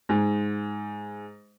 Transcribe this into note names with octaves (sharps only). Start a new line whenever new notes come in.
G#2